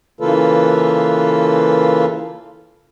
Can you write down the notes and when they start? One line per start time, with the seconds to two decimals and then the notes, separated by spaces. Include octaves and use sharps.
0.20 C#3 E3 A#3 F4 A4 B4